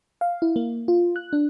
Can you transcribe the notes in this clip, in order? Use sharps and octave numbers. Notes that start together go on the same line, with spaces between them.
F5
E4
A#3
F4
F#6
D4